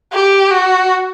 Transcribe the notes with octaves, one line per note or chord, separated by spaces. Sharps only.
G4
F#4